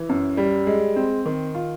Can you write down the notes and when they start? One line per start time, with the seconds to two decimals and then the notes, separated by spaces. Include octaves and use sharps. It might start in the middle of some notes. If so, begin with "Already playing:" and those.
Already playing: E3
0.09 F#2
0.37 G3
0.67 G#3
0.96 C4
1.26 D#3
1.55 F4